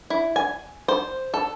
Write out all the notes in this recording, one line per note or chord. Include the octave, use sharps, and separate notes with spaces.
E4
G#5
C5
A4